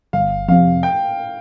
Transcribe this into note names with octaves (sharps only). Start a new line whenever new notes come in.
G1 F5
F2 C3 F5
G5